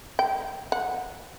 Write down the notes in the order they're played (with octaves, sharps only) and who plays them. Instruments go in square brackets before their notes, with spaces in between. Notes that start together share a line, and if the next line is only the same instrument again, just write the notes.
[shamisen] G5
F#5